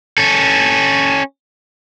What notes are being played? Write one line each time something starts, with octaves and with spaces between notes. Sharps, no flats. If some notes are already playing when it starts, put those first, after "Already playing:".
C#4 A4